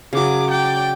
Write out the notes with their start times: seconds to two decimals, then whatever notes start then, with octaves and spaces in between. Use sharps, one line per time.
0.13 C#3 F#3 G#4 D6
0.51 D5 G5